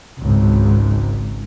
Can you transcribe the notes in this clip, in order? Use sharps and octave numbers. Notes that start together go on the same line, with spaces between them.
G#1 C#2